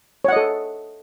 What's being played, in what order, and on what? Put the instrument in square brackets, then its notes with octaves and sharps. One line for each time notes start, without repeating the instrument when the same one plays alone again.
[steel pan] C#5
F#5
D#5
A4